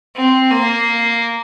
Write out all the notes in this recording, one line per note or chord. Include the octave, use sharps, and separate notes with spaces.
C4
A#3